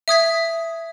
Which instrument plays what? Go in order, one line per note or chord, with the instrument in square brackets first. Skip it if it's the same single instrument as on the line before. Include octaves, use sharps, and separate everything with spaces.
[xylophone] E5 D#6 G#6 B6